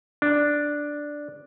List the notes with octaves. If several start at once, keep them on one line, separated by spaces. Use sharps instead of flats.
D4